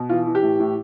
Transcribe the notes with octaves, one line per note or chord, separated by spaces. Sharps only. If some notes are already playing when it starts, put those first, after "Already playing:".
Already playing: B2
E3 F4
E3
G4
A2
A2